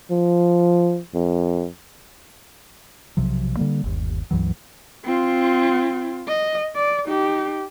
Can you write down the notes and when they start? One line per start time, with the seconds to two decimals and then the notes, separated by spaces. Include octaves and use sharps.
0.11 F3
1.14 F2
3.17 B1 C3 F3 F#3
3.57 D3 G3 A#3
3.84 G1 D#2
4.31 C#2 G2 E3 F#3
5.04 C4 F4
6.28 D#5
6.75 D5
7.06 D#4 G4